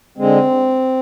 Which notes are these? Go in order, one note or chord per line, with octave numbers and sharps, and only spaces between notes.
D3 G#3 C4